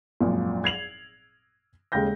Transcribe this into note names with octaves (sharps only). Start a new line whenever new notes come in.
G#1 F#2 A#2 F3
G#6 C7 F7 F#7
D#1 C#3 G#3 G5 G6 A#6